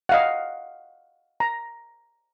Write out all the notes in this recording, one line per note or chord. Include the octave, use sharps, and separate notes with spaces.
D#5 F5 F#5
A#5